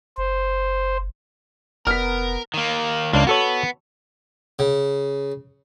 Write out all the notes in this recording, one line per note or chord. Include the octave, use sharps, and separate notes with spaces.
F#1 C5
F1 B3 A#4 F6 B6
D#3 A#3
C#2 A#3 D4
B3 F#4 A4 C#5
C#3